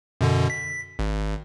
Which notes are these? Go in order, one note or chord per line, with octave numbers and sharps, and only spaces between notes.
F#2 B2 D3
B6
G#1